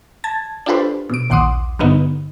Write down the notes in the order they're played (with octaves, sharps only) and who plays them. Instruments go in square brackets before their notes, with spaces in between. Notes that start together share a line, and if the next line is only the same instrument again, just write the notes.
[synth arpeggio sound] A5 G#6 A6
D4 F4 G4 A4 B4 C5
B2 D7
A#1 D#2 F#5 C6 D6 D#6
G2 D3 B3 D#4